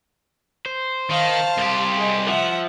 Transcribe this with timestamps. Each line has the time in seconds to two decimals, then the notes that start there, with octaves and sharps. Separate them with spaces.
0.66 C5
1.11 D#3 F5 A5
1.58 C2 G4
1.97 G#4 D#5
2.28 F3 E5 F#5